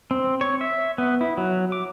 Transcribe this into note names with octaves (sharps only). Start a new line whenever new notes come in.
C4
C#5
E5
B3
E4
F#3
D6